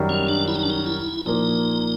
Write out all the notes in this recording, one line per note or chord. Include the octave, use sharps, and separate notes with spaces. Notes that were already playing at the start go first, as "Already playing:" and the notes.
Already playing: F#2 D#3 G3
C#4
D4
E4
D#4
D4
D#4
E4
A#2 F3 A#3 D#4